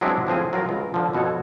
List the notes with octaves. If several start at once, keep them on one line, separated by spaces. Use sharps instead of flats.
F#3 G#3 B3 C4 D4 E4
A2 F3 C4 G#4
F#3 F4 A#4
C#2 C3
D3 F3
F2 B2 F#4 A4 C#5